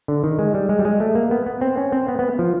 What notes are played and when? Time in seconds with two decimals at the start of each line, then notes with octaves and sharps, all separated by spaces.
0.08 D3
0.24 D#3
0.39 G#3
0.54 G3
0.69 G#3
0.79 G3
0.85 G#3
1.00 A3
1.15 A#3
1.31 B3
1.46 B3
1.61 C4
1.77 C#4
1.92 C4
2.08 B3
2.19 B3
2.39 F3